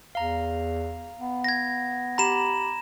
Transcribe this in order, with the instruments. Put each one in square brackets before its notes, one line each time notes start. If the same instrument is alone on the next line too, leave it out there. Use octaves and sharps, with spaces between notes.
[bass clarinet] E2 [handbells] F5 A#5
[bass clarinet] B3
[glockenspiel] G#6 A#6
[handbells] G4 B5 [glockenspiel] A#5 E7